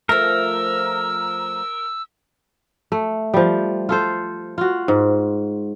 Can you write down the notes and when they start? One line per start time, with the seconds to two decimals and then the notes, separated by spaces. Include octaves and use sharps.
0.09 F3 A3 A#4 E6
2.92 A3
3.34 F3 G3
3.89 F4 A4 C5
4.58 F4 F#4
4.88 G#2